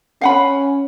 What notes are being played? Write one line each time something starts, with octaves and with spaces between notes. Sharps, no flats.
C#4 F5 F#5 B5